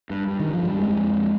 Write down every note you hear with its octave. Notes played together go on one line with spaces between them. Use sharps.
G2
G2
G2 D#3
F3
G2 G3
F2 G#3
F2
F2